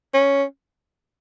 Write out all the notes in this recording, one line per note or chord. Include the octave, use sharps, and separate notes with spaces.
C#4